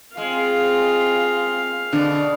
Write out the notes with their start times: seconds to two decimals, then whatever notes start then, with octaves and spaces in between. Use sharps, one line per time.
0.17 G#3 C4 F4 F5
1.93 B2 D3 D5